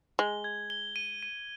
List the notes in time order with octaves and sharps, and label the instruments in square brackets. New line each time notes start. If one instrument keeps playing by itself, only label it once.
[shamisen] G#3 [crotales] G7
[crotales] G#6
G7
D#7
D#7